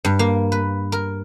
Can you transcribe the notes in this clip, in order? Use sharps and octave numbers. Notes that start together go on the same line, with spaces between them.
G2
A#3
B4
A#4